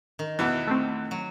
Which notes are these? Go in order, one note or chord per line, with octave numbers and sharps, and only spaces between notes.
D#3
E2 B2 E3
A3 C4
F#3